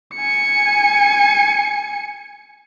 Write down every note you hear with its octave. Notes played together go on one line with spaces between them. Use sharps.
G#5 C#7